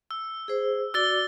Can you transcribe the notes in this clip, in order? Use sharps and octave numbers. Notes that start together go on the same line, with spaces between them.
E6
G#4 C5
F#4 D5 D6 E6 A6 G7